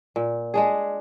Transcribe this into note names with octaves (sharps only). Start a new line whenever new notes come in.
A#2
G#3 D4 G#4